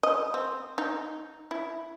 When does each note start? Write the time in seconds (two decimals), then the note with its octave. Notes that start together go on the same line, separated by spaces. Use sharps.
0.03 D#5
0.34 C4
0.78 D#4
1.51 E4